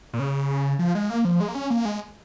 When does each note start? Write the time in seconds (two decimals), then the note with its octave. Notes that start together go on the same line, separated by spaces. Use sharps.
0.14 A#2
0.19 C#3
0.79 F3
0.95 G#3
1.10 A#3
1.25 F3
1.40 G#3
1.48 A#3
1.55 C#4
1.70 A#3
1.85 G#3